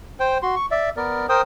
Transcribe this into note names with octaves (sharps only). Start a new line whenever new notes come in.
C5 G5
F#4 C6
C#6
D5 E5
B3 A#4 D5
A#4 C5 G5 D#6